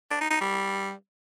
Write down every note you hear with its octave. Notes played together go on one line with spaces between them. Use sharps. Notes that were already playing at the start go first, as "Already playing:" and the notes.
D4
D#4
D#4
G3